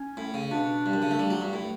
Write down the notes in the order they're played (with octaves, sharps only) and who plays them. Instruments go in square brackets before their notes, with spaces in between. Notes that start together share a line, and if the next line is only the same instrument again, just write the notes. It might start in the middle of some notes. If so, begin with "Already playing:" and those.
Already playing: [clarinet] C#4
[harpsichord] A2
C#3
[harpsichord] B2 [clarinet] D4
[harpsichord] G2
F#2
C#3
A3
G3
F#3
G2
A2